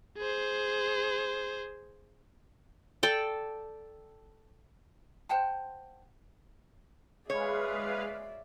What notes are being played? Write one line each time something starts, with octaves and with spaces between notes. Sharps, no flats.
G#4 C5
A4 D5 G5
C5 F#5 G5 A5
G#3 G#4 B4 C#5 D5 E5 F5